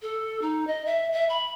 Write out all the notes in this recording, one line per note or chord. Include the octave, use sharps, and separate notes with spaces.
A4
D#4
D#5
E5
E5
B5